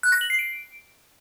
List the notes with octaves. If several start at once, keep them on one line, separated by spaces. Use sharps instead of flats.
F#6
A#6
F#7
C7
D7